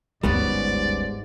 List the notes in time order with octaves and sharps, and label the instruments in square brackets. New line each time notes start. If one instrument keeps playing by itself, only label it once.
[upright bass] G1 D2 [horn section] G#2 [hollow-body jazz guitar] G3 B3 C#4 [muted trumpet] D5